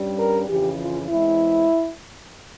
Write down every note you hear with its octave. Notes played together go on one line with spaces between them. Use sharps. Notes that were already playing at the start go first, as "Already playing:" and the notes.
Already playing: G2 G3 C#4
A#4
F2 C#3 E3 G4
F4
E2 E3 G#3 C4 E4